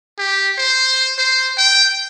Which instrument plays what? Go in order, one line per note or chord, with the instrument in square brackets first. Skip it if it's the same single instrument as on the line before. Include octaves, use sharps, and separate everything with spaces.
[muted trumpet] G4
C5
C5
G5